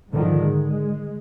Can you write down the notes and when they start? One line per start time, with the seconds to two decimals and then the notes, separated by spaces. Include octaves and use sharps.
0.13 G#2 D3 D#3 F3
0.42 G#3